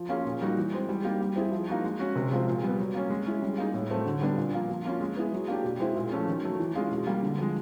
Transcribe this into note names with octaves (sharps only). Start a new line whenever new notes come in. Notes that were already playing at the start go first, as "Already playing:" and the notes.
Already playing: F3
A#3 C#4 F4 G#4
A#2
G3 A#3 D#4 F#4
E3
G#3 C4
G3
A#3 D#4 G4
G3
C4 E4 G#4
F3
A#3 D#4 F#4
G#3
C#4 F#4
C3
F3 G#3 C4 F4
A#2
G3 B3
F#3
A#3 C#4
G#3
C#4 E4 G#4
G3
A#3 D#4 G#4
A2
F#3 A3 C4
D3
G3 B3 D4
A#2
F3 A#3
F3
A#3 C#4 F4
G#3
B3 E4 G#4
F#3
A#3 D4 G4
B2
G#3 C4 E4 G#4
A#2
F3 A3 C#4
D#3
F#3 A3
E3
G#3 C#4 F4 G#4
B2
G3 A#3
D3
F3 G#3